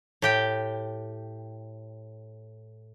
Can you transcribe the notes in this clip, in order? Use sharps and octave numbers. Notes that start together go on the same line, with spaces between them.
A2 G4 G5